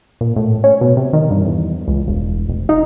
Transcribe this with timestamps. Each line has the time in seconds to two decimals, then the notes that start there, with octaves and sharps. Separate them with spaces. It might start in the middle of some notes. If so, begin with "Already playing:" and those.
0.21 A#2
0.36 A2
0.64 C#4
0.81 B2
0.97 C3
1.13 D#3
1.30 G2
1.45 E2
1.88 C#2
2.08 E1
2.49 F1
2.69 D#4